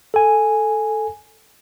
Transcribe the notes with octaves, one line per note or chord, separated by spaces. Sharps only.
A4 G#5